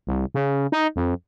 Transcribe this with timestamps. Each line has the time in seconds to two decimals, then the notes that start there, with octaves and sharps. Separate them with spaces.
0.07 C2
0.34 C#3
0.72 D#4
0.96 F2